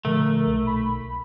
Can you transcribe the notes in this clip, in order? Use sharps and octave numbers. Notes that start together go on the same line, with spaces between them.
A#2 D3 F3 A3 A#4
B1
B5